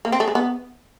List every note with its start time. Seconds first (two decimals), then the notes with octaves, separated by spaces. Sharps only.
0.05 A#3
0.12 C4
0.20 A3
0.28 G#3
0.35 B3